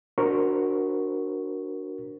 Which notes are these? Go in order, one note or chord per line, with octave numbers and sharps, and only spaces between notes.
D4 F#4 A#4 C5 C#6